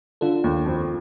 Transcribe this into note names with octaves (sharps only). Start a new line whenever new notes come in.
D3 F4 A4
D#2
F2